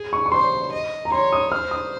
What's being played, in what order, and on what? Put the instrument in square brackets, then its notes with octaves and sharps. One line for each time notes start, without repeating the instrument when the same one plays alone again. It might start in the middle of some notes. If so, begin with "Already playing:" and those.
Already playing: [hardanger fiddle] G#4
[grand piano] C#6
C#6
[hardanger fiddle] C5 [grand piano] C6
[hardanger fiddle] D#5
[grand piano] A#5
[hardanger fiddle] C#5 [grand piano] C6
[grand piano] D#6
[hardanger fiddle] C5 [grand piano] F6
[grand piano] D#6